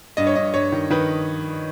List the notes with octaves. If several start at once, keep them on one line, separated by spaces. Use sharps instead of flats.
G2 D#5
C#5
G2 D#5
G2 C#5
D#3
D#3 B4